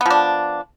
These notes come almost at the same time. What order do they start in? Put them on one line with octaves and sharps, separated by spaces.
B3 F3 D4